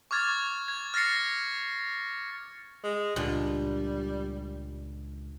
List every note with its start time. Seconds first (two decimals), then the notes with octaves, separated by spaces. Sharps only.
0.11 C#6 D6 F6 G#6 A6
0.68 G#6
0.94 F6 A6 A#6 C7 C#7
2.83 G#3
3.16 C#2 A#2 D3 G3